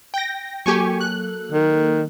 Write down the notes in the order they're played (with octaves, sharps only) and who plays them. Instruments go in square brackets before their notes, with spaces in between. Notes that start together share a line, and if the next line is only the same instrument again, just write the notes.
[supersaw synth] G5 A#6
[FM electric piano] F#3 A#3 A4 [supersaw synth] G4 G#5 C#6
[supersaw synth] F#6
[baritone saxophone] D#3